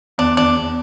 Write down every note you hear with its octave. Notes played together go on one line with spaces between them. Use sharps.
E2 D4
E2 D4
E2